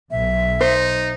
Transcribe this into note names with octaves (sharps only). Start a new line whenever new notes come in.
B1 E5
D#4 C5